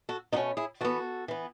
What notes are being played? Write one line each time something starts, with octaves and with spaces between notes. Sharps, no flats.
F#4 A4
B2 A3 C#4 D#4 F#4
E4 G#4
E3 B3 F#4 A4
E3 B3